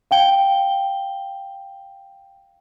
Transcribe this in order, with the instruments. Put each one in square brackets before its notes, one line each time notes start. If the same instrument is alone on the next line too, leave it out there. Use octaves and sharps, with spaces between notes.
[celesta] F5 G5 G7